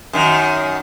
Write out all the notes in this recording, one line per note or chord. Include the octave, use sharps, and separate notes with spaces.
F#2 D#3